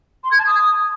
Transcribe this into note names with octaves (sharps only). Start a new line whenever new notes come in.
C6
G#6
A5
D#6